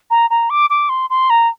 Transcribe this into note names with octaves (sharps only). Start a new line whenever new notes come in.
A#5
A#5
D6
D6
C6
C6
A#5